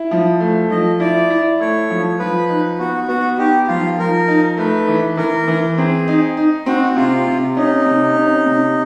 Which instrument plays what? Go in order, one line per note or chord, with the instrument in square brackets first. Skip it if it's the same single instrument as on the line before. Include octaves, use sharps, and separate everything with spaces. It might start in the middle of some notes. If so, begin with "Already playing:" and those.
Already playing: [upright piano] E4
F3
A3
[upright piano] F3 [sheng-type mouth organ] D#5
[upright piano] E4 [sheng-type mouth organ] D5
[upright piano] E4
[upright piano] A3 [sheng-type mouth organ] C#5
[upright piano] F3
[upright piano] F3 [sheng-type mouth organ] B4
[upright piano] D#4
[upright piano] B3 [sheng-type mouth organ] F#4
[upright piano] B3 [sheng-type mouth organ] F#4
[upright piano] D#4 [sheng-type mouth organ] G4
[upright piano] F3 [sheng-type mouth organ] F4
[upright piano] F3 [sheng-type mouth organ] A#4
[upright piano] D#4
[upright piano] A3 [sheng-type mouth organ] B4
[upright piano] E3
[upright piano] E3 [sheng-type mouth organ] A#4
[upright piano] E3
[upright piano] C4 [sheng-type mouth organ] G#4
[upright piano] D#4
D#4
[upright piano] C4 [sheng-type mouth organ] F#4
[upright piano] C3 [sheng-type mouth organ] F4
[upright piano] C3
[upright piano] C#4 [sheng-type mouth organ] D#4
[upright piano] C3
C#4
C3